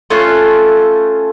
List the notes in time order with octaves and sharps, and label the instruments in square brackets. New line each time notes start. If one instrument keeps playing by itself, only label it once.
[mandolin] A3 C#4 F4 F#6